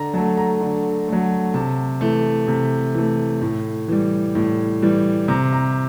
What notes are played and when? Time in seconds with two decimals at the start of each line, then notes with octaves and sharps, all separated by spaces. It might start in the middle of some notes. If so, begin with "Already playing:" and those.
Already playing: D3 A#5
0.14 F#3 A5
0.17 A3
0.37 A#5
0.61 D3
1.08 F#3 A3
1.54 C3 A5
2.01 E3 A3
2.48 C3
2.94 E3 A3
3.42 A2
3.88 E3 G3
4.35 A2
4.82 E3 G3
5.28 C3 A#5
5.53 A#5